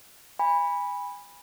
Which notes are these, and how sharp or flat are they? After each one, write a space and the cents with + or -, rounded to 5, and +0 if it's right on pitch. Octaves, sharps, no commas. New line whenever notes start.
G#5 -35 B5 -5